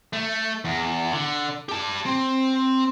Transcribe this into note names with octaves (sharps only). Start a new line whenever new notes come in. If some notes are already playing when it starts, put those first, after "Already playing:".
A3
E2
D3
G4 A5
C4